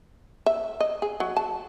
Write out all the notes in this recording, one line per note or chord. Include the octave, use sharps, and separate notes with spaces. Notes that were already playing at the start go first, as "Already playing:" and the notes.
E5
D#5
G#4
F#3
A5